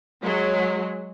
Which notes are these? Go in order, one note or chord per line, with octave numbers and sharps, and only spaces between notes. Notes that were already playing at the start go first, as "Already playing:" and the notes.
F#3 G#3